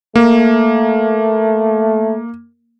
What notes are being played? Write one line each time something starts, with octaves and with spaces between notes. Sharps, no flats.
A3 A#3